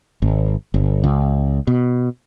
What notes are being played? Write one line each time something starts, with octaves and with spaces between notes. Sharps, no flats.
G#1
G1
C#2
B2